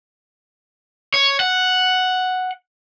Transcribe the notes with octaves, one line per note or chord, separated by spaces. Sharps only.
C#5
F#5